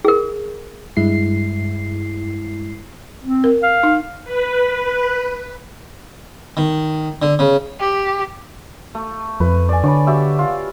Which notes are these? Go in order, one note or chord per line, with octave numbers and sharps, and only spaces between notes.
G#4 A#4
G2 G#3 E4 C7
C4
A#4
F5
D#4
B4
D#3
D3
C#3
G4
A3
F2 B4
D5 G#5
D3 C#5 D5 B5
F#4 G4 E5
F4